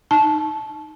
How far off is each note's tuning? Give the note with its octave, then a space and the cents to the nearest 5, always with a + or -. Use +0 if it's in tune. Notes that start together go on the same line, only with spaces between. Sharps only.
D#4 +0 A5 -20